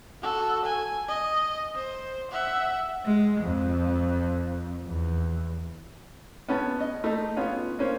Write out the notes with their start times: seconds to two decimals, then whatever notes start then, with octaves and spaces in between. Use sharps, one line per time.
0.22 F#4 A4
0.66 G#5
1.08 D#5
1.75 C5
2.32 E5 F#5
3.05 G#3
3.41 F2
4.85 E2
6.49 B3 C#4 A5
6.80 D#5
7.04 A3 D#4
7.37 B3 C#4 F4
7.79 A#3 C#4 C5